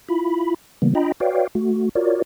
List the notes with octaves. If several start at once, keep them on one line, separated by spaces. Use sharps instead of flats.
E4 F4 B5
C#3 E3 G3 A#3 B3
D4 F4 D#5 G5 A#5 B5
F#4 B4 C#5 D5 F5 G5
A3 F#4
F4 F#4 A#4 C#5 D5